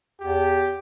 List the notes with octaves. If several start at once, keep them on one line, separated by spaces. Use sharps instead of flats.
E2 G4